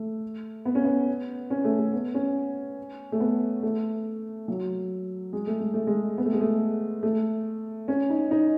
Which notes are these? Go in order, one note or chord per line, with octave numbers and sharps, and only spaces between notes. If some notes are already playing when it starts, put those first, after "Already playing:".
Already playing: A3
B3
C#4
B3
C#4
A3
A3
B3
C#4
A3
B3
A3
F#3
G#3
A3
G#3
A3
G#3
B3
A3
G#3
A3
A3
C#4
D#4
D#4